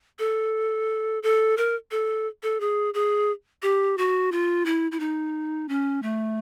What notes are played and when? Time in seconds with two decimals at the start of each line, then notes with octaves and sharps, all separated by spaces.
0.19 A4
1.23 A4
1.57 A#4
1.91 A4
2.43 A4
2.60 G#4
2.94 G#4
3.62 G4
3.98 F#4
4.32 F4
4.66 E4
4.92 E4
5.00 D#4
5.69 C#4
6.03 A3